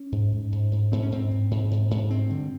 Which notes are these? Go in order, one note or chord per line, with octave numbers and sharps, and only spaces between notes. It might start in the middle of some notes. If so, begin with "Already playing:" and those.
Already playing: C#4
G#2
G#2
G#2
G#2
G#2 C4
C#4
G#2 C4
G#2
G#2
G#2
G#2
G2 C4
D3